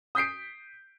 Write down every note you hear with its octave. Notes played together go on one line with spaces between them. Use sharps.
D#6 G6 B6 C7 D7